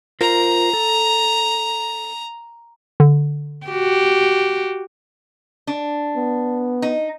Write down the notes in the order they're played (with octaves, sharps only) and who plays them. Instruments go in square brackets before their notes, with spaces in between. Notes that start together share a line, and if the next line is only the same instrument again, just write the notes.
[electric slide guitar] F4 A#4 C5 [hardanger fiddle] A#5
[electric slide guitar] A4
[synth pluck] D3
[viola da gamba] F#4 G4
[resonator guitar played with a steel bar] D4
[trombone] B3
[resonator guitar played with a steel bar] D#4